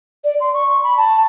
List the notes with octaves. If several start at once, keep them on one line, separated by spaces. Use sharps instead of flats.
D5
C6
C#6
B5
A5